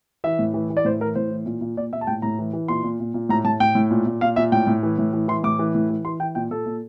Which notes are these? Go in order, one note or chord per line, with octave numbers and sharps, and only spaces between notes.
E3 E5
A2
E3
E3
D5
A2 C5
E3 A#4
A2 C5
E3
A#2
A#2
A#2 D5
A#2 E5
A5
A2 G5
A2 A#5
E3
E3
A#2 C6
A#2
A#2
A#2
A2 A#5
A2 A5
A2 G5
A2
A#2
A#2
A#2 F5
A#2 E5
A2 G5
A2
E3
A2
E3
E3 C6
A2 D6
E3
A2
E3
E3 C6
E3 G5
A#2 G5
A#2 A4
A#2